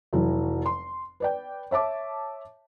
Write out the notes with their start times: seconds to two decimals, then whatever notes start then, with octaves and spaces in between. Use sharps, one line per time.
0.13 F1 E3 F#3
0.66 C6
1.20 B4 D5 G5
1.71 C#5 E5 A5 D6